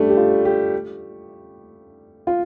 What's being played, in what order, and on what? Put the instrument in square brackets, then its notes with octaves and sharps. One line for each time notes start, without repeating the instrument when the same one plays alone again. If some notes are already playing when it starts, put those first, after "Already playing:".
Already playing: [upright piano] G3 A3 D4
G4
F4
G4
F4